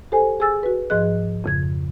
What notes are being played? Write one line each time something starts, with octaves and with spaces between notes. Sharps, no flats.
G4 A4 C5 G#5
G#4 G#5 E6 A6
F#4 B4
G#2 F3 G#4 D#5 F#6
F2 C#3 G#6